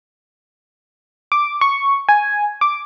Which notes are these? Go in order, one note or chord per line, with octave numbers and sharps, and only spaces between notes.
D6
C#6
G#5
D6